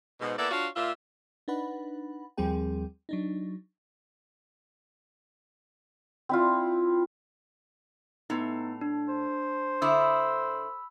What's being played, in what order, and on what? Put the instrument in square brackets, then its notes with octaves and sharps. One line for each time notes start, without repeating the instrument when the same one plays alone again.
[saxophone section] G#2 B2
A#3 B3 E4 A4 D5
D4 F4 F#4 C#5 F5
A#2 F4 E5
[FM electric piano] D4 D#4 B4 F#5 B5
D#2 F3 G3 C4 G#4 G5
F#3 D4 D#4
[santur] C4 E4 F4
[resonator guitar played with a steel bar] A2 [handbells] B3 D#4
[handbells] D4
[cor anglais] C5
[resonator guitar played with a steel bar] D3 E4 [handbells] B5 D#6 E6
[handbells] B5 E6